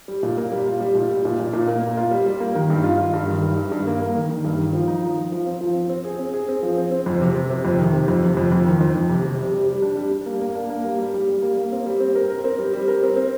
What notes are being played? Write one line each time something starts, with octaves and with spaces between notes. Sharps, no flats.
G3
A#2
A#3
G3
F4
G3
A#2
G3
A#2
A#2
A#2
A#3
A#3
F4
G3
G3
A#3
D#3
G2
F4
F4
G2
D#3
G2
G2
G2
A#3
A#3
D#3
D#3
G2
D#3
F3
D#4
F3
F3
F3
C4
F3
C4
C4
G#4
C4
G#4
C4
F3
C4
C4
F2
C3
C3
C3
F2
D#3
C3
F2
C3
F2
F2
D#3
F2
F2
C3
C3
G3
G3
G3
D4
G3
G3
A#3
A#3
D4
A#3
G3
G3
G3
G3
A#3
A#3
C4
G3
C4
A#4
A#4
C4
G3
G3
A#4
C4
C4